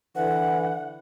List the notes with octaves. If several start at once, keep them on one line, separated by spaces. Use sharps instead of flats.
D3 E3 F#5